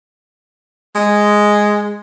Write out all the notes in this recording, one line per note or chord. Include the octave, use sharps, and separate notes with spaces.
G#3